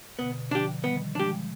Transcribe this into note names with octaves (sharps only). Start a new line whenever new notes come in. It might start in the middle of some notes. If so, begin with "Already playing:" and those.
B2 D3 B3
D3 F3 D4 G4
D#3 G3 B3
F3 G#3 D4 G4